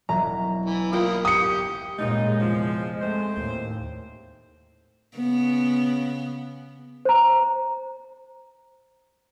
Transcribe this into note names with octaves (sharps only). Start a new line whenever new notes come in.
E1 F#3 E5 A#5
E3
A#3 E4 F4 A#4 G5 D#6
G4 D#6 C#7
F#2 A#2 G3 G#3 B3 D#4
E2 C3 F3
A3 C4 C5
D#2 A2
C#3 B3
C5 A#5